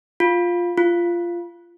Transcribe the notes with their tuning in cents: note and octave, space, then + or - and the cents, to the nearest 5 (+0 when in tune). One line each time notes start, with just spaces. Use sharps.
F4 +5
F4 -15